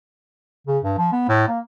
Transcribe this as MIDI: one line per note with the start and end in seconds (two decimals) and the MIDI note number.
0.67 0.79 49
0.84 0.96 43
0.98 1.08 53
1.12 1.26 59
1.29 1.46 45
1.48 1.59 58